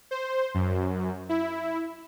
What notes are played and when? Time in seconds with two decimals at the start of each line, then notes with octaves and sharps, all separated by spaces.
0.11 C5
0.54 F#2
1.29 E4